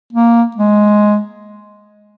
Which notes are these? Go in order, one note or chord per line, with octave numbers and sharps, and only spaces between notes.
A#3
G#3